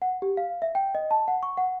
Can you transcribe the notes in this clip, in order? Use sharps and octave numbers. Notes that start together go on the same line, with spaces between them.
F#5
G4
F5
E5
G5
D#5
A5
F#5
C#6
F#5